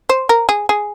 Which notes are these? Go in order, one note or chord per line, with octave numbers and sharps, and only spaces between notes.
C5
A#4
G#4
G#4